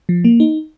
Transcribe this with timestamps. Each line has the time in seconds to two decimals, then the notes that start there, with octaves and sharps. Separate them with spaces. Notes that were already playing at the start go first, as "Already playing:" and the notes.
0.09 F3
0.24 A#3
0.40 D#4